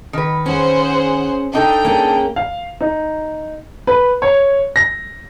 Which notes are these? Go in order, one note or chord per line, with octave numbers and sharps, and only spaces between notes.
D#3 B4
C#4 G#4 C5 F#5
D4 D#4 A4 G5 A#5
A#3 C#4 G#4
F5
D#4
B4
C#5
A#6